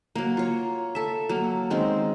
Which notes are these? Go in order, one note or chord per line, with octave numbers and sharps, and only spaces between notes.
F#3 A#3
F4 C#5
A4 E5
F#3 A#3
D#3 G#3 C4 C#4